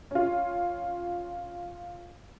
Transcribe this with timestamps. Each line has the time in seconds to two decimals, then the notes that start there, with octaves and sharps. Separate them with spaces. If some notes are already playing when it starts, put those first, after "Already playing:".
0.11 C#4 F4